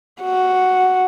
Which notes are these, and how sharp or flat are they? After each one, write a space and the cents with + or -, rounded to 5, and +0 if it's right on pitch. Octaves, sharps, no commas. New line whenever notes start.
F#4 +0